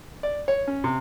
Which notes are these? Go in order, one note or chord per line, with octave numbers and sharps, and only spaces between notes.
D5
C#5
C#4
C3